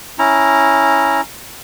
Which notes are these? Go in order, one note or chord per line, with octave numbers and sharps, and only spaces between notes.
C#4 E4 A#5